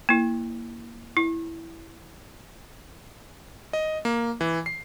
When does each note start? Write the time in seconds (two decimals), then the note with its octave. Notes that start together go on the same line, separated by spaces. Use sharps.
0.09 A#3 E4
1.17 E4
3.73 D#5
4.05 A#3
4.41 E3
4.66 C7